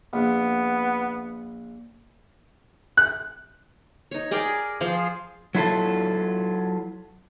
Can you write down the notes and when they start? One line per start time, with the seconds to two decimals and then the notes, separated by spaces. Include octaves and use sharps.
0.13 A#1 B3
2.97 F#6
4.11 D#4 C#5
4.31 G#4 A#4 D5 G5
4.81 F3 F4 G#4 C5
5.55 F#3 E4 F4 A4